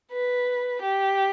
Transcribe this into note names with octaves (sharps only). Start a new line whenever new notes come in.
B4
G4